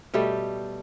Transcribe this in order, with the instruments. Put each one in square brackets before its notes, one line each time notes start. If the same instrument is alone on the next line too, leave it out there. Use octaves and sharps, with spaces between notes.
[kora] B2 G3 A3 G4